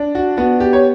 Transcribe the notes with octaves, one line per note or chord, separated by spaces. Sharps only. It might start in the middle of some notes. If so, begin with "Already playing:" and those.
Already playing: D4
F#4
B3 F#4
G4
C#5